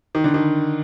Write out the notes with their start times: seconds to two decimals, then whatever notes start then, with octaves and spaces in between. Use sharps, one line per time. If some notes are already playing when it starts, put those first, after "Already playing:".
0.15 D#3
0.24 D3
0.34 D#3